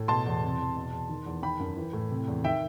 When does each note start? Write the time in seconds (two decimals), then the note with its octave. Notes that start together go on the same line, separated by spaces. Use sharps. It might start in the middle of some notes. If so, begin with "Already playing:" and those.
Already playing: A2
0.08 B2 A5 C6
0.26 E2
0.43 C3
0.60 E2
0.76 B2
0.92 E2
1.09 D#3
1.26 E2
1.43 D#3 G5 B5
1.60 F#2
1.77 E3
1.93 A2
2.11 C3
2.27 E2
2.44 D#3 E5 G5